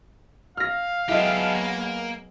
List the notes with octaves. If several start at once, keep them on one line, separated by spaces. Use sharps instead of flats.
F5 F6 A#6
F#3 G#3 B3 E4 G4 A4 D#5
A#3